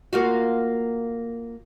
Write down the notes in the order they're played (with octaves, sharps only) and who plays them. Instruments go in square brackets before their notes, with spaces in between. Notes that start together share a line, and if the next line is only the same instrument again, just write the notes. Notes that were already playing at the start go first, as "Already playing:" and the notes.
[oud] A#3 F4 F#4